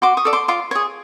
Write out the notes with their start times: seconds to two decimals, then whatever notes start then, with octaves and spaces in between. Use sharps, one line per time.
0.02 F#4 C6 D6
0.17 C#6 D#6
0.25 A4 D5
0.33 C6 D6
0.48 F4 C6 D6
0.71 G#4 C#5